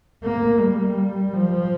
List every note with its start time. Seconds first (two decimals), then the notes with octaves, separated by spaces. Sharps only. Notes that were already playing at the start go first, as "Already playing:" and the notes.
0.24 A#3
0.59 G3
1.34 F3